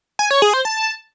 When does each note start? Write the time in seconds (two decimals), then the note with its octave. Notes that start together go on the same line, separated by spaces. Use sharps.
0.19 G#5
0.31 C#5
0.42 G#4
0.54 C5
0.65 A5